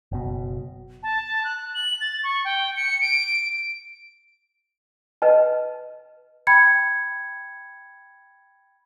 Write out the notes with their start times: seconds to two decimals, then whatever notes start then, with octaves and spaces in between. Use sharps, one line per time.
0.12 F#1 B2
1.03 A5
1.44 F#6
1.74 F#7
2.01 A6
2.24 C#6
2.45 G5
2.77 C#7
3.01 D7
5.22 B4 D#5 A5
6.47 G5 B5 G#6 C#7